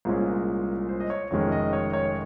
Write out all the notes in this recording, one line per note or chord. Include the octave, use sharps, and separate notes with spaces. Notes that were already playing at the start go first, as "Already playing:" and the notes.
C2 A#2 G#3 C#4 C5
C5
D#5
C#5
F1 F2 D#3 G#3 C#4 C#5
D#5
C#5
C#5